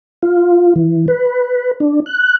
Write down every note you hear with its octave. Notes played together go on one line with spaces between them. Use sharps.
F4
E3
B4
D4
F#6